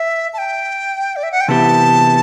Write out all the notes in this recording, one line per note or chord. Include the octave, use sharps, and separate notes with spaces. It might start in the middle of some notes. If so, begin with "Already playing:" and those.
Already playing: E5
A5
G5
D5
E5
F#5
G5
C3 E3 B3 E4 G4 A5